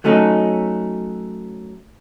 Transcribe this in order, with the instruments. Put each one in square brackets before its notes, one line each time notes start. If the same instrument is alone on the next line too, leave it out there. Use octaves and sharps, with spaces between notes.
[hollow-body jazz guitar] F#3 A3 C#4 D#4